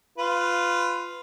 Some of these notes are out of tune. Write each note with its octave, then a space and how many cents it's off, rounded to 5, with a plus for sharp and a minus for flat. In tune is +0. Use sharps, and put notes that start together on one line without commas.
F4 +0 B4 +15